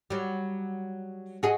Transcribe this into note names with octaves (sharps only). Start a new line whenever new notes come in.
F#3 G3
F#4 G#4 D#5